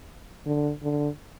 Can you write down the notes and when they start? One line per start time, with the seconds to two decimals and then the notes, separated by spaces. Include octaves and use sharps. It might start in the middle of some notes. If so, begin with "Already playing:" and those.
0.46 D3
0.83 D3